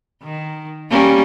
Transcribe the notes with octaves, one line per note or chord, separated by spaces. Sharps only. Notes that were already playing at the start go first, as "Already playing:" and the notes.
D#3
G3 A#3 C#4